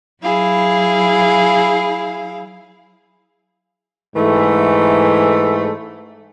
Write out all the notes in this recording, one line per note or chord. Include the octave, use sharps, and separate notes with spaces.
F#3 E4 G#4 F5
G#2 E3 A3